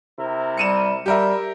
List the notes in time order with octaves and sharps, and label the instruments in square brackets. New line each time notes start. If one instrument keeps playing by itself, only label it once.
[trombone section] C3 E4 A#4
[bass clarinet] G3 [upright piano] C#7 D#7 E7
[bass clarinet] G3 [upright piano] G4 A#4 E5